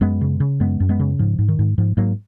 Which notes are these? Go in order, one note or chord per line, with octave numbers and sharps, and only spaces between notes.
F#2 G#3 B3
C#3
C#3
F#2 G#3 B3
F#2
G#3 B3
C#3
G#2 F3
G#2
D#3
G#2
G#2 F3
G#2 F#3 A#3